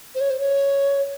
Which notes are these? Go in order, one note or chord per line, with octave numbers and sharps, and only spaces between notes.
C5
C#5
C5
C#5